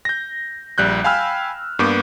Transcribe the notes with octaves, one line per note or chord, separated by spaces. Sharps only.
G6 A#6
A#1 G3 F#6 G6
F5 G5 G#5 B5 E6 F6
G2 A#3 B3 B4 D6 G6